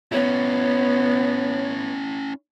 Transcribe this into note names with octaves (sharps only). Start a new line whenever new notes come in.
B3 C#4 E4 C#5